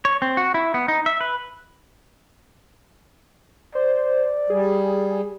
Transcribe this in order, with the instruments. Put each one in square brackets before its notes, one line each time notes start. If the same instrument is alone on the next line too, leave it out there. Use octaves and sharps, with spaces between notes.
[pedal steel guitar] C#5
C4
F#4
E4
B3
D#4
E5
B4
[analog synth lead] C5 [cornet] D5
[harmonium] G3 [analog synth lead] G#4